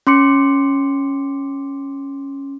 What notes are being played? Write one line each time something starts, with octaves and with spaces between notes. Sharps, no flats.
C#4 C6 D6 C#7